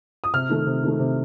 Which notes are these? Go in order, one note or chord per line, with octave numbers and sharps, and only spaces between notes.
D#6
C3 F6
D#3 A3
C3
D#3 A3
C3